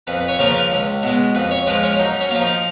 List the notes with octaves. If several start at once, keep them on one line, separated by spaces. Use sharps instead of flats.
F2 B4
B4
C#5
C#3 F3 A#3 A#4
B4
C#2
B2 G#3
F2 B4
C#5
F3 G#3 B4
C#4
F#2 D#4
C#4
F3 A#3
D#4